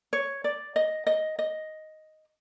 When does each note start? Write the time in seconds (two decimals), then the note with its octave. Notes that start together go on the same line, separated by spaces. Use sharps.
0.13 C#5
0.44 D5
0.76 D#5
1.07 D#5
1.39 D#5